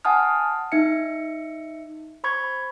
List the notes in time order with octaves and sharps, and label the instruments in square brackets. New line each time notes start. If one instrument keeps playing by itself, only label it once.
[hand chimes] F#5 G#5 A5 D#6 F6
D#4 E5 C#7
C5 B5 C#6 G#6